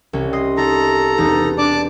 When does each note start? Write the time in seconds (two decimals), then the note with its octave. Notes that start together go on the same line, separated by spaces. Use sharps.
0.13 C2 C#4
0.33 D#5 C6 D#6
0.57 D#4 A4 A#5
1.18 E1 B3 D#4
1.58 D4 D5 A5 D6